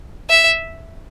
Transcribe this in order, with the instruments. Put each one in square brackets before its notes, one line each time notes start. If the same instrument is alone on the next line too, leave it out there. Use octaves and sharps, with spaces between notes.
[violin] E5